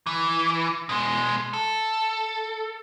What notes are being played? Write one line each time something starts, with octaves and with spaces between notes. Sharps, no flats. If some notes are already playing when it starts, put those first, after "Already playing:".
E3
B2 G#3
A4